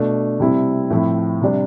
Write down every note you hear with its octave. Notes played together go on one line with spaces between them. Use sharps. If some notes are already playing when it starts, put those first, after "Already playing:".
Already playing: B2 A3 D4
C3 G3 C4 E4
A2 F3 C4 E4
C3 G3 D4